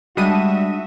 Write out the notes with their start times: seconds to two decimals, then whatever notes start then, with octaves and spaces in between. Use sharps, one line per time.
0.17 G3 G#3 D4 F#4 E5 D#6 D#7